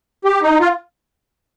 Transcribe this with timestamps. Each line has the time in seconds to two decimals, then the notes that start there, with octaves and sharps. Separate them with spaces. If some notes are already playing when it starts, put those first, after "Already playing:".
0.24 G4
0.42 D#4
0.60 F4